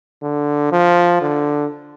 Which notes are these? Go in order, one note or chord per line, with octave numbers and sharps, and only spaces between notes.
D3
F3
D3